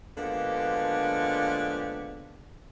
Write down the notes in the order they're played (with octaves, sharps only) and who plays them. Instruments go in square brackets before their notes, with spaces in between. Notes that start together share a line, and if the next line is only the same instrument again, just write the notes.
[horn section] D3 F3 G#3 A#3 B3 G4